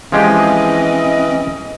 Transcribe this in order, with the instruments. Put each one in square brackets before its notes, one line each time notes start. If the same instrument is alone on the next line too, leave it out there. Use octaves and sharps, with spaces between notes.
[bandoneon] E3 [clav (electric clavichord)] F3 G#3 G4 [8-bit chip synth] C4 C#4 [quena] D#5